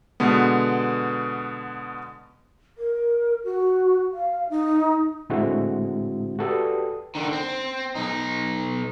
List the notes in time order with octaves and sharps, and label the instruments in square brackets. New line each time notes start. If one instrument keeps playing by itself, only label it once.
[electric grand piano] B2 D3 G#3 B3
[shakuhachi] A#4
F#4
F5
D#4
[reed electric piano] A2 D3 G#3 C4 E4 F#4
F#4 G4 A4 B4 D5 D#6
[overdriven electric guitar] D3 D#3
C4
B1 D#4